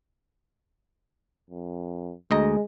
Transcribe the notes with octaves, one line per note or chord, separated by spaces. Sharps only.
F2
D2 G#3 D#5 A#5